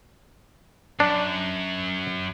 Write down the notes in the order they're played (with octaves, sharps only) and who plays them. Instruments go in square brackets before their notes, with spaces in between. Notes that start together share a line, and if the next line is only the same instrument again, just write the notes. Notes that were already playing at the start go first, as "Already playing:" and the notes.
[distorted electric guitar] F#2 [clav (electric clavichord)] D4